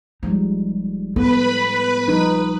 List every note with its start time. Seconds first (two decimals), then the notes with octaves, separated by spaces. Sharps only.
0.23 F1 F3 G3 G#3 D#4
1.16 A2 B3 A4 B4 B5
2.08 D#1 F3 G3 D#4